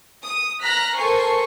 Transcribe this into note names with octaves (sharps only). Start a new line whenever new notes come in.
D#6
A#5 F6 F#6 A#6 B6
A4 A#4 C5 G#5 C#6 C7